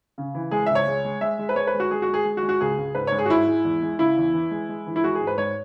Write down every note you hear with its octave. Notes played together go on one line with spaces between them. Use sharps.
C#3
E3
G#3 G#4
C#2 E5
C#5
G#3
G#3
G#3 E5
G#3
B4
G#3 C#5
B4
G#3
F#4
G#3 G#4
F#4
G#3
G#4
G#3
F#4
G#3
F#4
C#2 G#4
C#2
G#2 B4
G#2 C#5
G#4
F#4
G#2 E4
G#3
E2
G#3
C#3 E4
E2
E3
G#3
G#3
E3
E4
G#3 F#4
G#4
G#2
B4
G#2 C#5